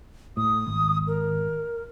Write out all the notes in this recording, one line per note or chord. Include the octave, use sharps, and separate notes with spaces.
A2 D#6
G#1
A#4